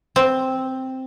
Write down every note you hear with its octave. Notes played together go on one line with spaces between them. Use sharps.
C4